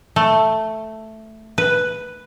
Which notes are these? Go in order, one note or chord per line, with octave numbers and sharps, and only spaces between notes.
A3
B4